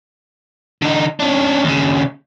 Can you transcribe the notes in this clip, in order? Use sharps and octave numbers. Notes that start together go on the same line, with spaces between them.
D3 D#4
C#4 D4
D#2 C#3